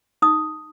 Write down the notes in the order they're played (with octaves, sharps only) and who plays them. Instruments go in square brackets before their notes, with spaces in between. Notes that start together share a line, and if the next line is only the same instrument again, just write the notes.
[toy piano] D#4 D#6